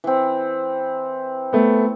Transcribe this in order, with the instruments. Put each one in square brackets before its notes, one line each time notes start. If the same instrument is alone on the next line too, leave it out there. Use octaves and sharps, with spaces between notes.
[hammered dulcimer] E3 C4
[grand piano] A3 B3